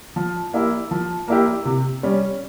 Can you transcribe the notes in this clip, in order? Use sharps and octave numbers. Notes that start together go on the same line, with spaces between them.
F3
A#3 E4 G4
F3
A#3 E4 G4
C3
G3 C#4